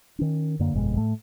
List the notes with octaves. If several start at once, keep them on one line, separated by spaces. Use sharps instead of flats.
D#3 C#4
F#2 D3 A#3
G1 F2 B2 G#3
A2 A3